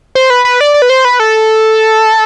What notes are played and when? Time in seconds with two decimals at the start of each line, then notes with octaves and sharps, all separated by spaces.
0.15 C5
0.30 B4
0.45 B4
0.61 D5
0.74 D5
0.82 B4
0.90 C5
1.05 B4
1.20 A4